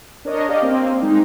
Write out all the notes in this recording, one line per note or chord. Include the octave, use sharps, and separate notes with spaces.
D4 A#4 C#5 D#5
G4 D5 D#5 F5
A#3 C4
G#3 D#4